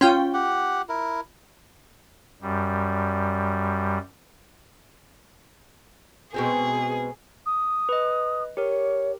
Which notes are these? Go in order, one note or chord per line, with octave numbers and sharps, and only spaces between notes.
C#4 F4 G5 C6
G4 F#5
E4 A#4
F#2 G3
B2 G#3 C4 G#4
D#6
B4 D#5
G4 A#4 C#5